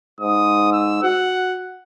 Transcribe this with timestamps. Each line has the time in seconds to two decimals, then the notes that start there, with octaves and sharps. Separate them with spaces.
0.21 G#2 D#6
0.73 E6
1.03 F#4 F#5